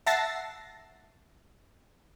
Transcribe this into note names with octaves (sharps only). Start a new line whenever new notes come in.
E5 F#5 A5 A6 A#6 C7